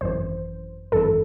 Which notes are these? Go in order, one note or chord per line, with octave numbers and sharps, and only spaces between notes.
G#1 F#2 E3 C5
G#1 F#2 E3 A4